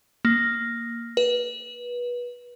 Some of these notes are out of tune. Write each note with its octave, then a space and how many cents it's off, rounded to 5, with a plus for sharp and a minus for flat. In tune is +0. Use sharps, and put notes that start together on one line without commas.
A#3 +0
B4 -25